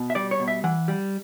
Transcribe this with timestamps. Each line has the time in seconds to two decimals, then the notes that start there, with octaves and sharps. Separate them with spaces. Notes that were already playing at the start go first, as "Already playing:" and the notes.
Already playing: B2
0.10 E5
0.15 G3 D5
0.31 C#5
0.40 B2
0.48 E5
0.64 E3 F#5
0.88 G3